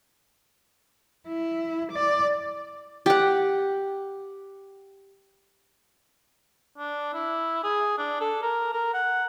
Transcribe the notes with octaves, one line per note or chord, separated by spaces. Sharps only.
E4
D5
G4 F#5
D4
E4
G#4
D4
A4
A#4
A#4
F#5